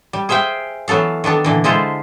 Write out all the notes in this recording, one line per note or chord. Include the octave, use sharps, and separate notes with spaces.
G3
G#4 C5 E5 F5 G5 G#5
E3 F#3 B3 A4 F5
D#3 B3 D4 A4
A#2 D3 E3
D3 G#3 E4 F4 A4 C5